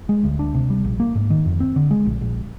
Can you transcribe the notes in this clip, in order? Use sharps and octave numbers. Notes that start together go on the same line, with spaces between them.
G#3
D2
D4
C3
G3
A#1
A#3
G#2
D#3
F2
C4
D3
G#3
A#1
A#1